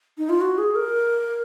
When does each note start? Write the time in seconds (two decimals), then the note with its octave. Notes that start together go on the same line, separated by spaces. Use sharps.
0.18 D#4
0.29 F4
0.41 F#4
0.58 G#4
0.75 A#4